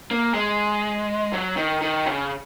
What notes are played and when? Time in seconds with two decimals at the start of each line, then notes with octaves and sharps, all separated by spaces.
0.11 A#3
0.34 G#3
1.33 F#3
1.57 D#3
1.81 D#3
2.06 C#3